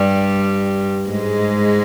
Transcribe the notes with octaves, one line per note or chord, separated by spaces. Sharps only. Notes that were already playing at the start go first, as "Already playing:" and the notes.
Already playing: G2 G3
G#2 G#3